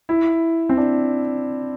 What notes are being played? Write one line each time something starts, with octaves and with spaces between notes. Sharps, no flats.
E4
C4
D4